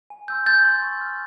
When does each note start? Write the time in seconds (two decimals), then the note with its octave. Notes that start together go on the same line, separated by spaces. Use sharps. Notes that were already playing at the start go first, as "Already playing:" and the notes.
0.10 G#5
0.28 C6 E6 G6
0.46 G#5 G6 A6
0.64 C6 E6 G6
0.82 C#6
1.01 F6